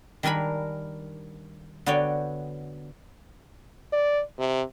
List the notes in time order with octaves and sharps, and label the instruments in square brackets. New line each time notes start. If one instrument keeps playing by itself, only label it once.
[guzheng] D#3 G3 D4 A#4 G#5 B5
D3 B3 F#4 C#5 D5 G5
[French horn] D5
C3